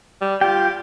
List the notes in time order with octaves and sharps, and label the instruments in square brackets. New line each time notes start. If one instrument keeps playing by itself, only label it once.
[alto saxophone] G3
[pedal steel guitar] F4 G5 [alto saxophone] G4